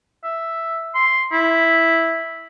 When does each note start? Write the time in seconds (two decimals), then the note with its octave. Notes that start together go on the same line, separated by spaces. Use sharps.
0.24 E5
0.94 C6
1.32 E4